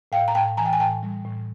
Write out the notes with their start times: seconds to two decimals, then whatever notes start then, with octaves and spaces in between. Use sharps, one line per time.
0.12 A2 F5 G5
0.28 A#5
0.35 A2 G5 A5
0.57 E3 G#5 A#5
0.66 G5
0.73 G#5
0.80 A2 G5 A5
1.03 G3
1.26 A2